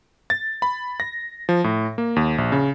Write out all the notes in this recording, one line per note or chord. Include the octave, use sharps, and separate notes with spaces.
A6
B5
A#6
F3
A2
A#3
D#2
A#1
C#3